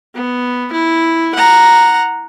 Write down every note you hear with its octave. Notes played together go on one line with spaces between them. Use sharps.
B3
E4
F#5 A#5